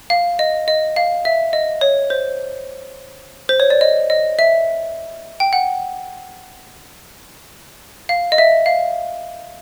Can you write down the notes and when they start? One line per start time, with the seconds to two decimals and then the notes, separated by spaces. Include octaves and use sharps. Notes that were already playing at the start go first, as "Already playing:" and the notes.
0.10 F5
0.39 D#5
0.68 D#5
0.96 F5
1.25 E5
1.53 D#5
1.81 C#5
2.10 C5
3.49 C5
3.60 C#5
3.70 D5
3.81 D#5
4.10 D#5
4.39 E5
5.40 G5
5.53 F#5
8.09 F5
8.32 D#5
8.38 E5
8.66 F5